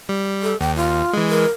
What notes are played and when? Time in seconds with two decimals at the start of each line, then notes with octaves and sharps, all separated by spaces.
0.09 G3
0.43 A4
0.61 D#2 G5
0.76 F4
1.13 E3 G#3
1.30 A#4